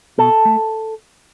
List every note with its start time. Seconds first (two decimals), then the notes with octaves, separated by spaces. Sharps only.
0.18 B2 A4
0.45 A3